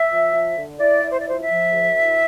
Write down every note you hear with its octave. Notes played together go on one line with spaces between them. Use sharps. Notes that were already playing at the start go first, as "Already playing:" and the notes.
Already playing: E5
F3
F3
D3
E4 D5
E4
C5
D5
F3 C5
E5
F3
D2
E4